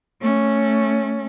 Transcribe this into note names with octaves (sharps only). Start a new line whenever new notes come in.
A3 C#4